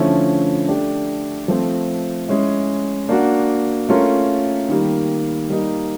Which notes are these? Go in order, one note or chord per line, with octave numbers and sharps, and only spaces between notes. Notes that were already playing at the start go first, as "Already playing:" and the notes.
Already playing: D3 F3 A3 C#4 E4
A3 D4 G4
F3 A3 C4
G#3 C#4 E4
A#3 D4 F#4
A3 C#4 F4 A#4
D#3 G3 A#3
G3 A#3 D#4